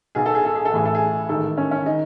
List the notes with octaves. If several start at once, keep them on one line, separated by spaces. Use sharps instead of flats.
B1 B2 G#4
A4
G#4
A4
G#4
A4
A1 A2 E3 G#4
A4
G#4
A1 G#2 D#3 A4
C#4
C#4
D#3 D#4